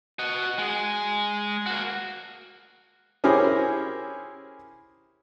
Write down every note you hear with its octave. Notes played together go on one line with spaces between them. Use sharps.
F#4 D#5
G#3 G#4
A#3 F#4
C#4 E4 G4 G#4 A#4 C5